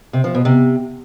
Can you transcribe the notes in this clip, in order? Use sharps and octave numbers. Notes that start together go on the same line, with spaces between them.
C3
F3
B2
C3